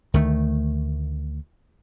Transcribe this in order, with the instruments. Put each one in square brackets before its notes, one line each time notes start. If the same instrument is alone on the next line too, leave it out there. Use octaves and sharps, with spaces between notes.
[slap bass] D2 D#3 A3